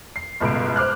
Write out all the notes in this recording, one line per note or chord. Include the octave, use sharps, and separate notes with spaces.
C7
G1 C#2 B2 D7
C5 D6 F6 F#6